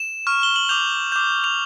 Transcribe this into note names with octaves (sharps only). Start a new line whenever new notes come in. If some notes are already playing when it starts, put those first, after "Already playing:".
Already playing: E7
C#6 F6
G7
F#7
D6 G6 F7
D6 G6
F7